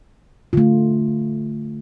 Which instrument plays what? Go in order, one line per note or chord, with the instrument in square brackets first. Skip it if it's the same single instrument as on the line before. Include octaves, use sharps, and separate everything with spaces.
[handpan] D3 A3 F4